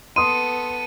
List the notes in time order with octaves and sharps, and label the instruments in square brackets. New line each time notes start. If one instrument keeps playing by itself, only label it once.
[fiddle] B3 A4 [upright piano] C6 D#6 [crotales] D#7